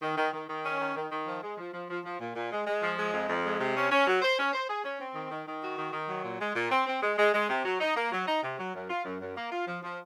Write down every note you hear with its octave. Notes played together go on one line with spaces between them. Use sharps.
D#3
D#3
D#3
D#3
C#4
D#3
D#3
D#3
F3
G#3
F3
F3
F3
F3
A#2
A#2
G#3
G#3
F3
G#3
F2
F2
G#3
C3
C#4
C#4
F#3
C5
C#4
C5
G#4
C#4
C4
D#3
D#3
D#3
F#4
D#3
D#3
F#3
A#2
G#3
A#2
C4
C4
G#3
G#3
G#3
C3
F#3
D#4
A#3
F#3
D#4
C3
F#3
F#2
F4
F#2
F#2
A#3
F4
F3
F3